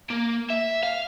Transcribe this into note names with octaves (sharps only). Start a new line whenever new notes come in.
A#3
E5
F5